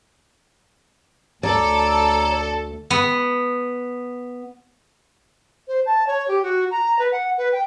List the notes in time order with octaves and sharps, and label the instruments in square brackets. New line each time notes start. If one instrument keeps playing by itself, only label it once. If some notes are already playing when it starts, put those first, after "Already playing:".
[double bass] D2 [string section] A4 [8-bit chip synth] C#5 A#5 [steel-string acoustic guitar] D5
[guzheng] B3
[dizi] C5
A5
C#5
G4
F#4
A#5
B4
F#5
B4
G5